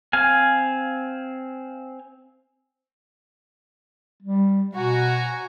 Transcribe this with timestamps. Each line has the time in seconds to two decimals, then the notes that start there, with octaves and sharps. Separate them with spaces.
0.13 C4 F5 G#5
4.23 G3
4.75 B2 F#4 G#5 A#5